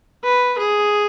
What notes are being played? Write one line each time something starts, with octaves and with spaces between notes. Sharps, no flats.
B4
G#4